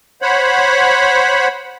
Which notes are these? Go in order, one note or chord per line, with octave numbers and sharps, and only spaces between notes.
C5 C#5 F#5 B5